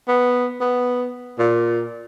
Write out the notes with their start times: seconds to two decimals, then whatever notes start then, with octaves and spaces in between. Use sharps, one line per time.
0.08 B3
0.61 B3
1.38 A#2